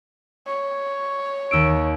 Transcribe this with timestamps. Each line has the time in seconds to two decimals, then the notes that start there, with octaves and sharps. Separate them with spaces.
0.46 C#5
1.51 D#2 E6 D7